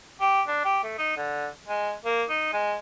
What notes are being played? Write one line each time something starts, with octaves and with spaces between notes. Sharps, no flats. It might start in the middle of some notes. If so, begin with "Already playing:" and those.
G4
D4
G4
A3
D#4
D3
G#3
A#3
D#4
G#3